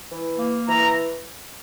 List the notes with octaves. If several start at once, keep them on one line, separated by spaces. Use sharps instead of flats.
E3
A#3
E3 A#5